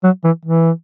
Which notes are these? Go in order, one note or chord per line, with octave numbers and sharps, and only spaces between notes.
F#3
E3
E3